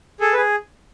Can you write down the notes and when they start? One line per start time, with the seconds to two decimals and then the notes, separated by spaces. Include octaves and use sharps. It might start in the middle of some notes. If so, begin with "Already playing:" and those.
0.20 G#4 A4
0.33 B4
0.37 G#4